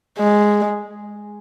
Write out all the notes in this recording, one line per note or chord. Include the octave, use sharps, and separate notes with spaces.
G#3